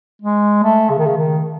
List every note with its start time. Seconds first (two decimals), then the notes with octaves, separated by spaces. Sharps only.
0.22 G#3
0.63 A3
0.90 C#3
0.98 D#3
1.06 C#3
1.18 D#3